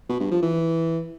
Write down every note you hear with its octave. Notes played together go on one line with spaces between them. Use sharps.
B2
G2
F3
E3